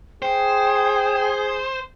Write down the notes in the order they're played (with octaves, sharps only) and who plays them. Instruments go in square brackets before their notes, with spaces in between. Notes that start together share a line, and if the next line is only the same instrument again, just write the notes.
[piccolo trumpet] G#4 [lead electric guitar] C5 [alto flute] G5